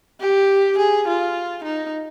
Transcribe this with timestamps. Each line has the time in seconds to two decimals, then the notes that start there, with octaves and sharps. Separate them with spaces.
0.21 G4
0.78 G#4
1.07 F4
1.64 D#4